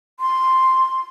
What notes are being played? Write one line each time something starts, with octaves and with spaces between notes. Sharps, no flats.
C6